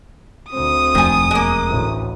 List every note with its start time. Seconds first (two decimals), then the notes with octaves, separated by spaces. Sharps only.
0.51 D2 C4 D#6
0.95 E1 F2 D#3 A3 G#5
1.31 G#3 A#3
1.68 A1 D2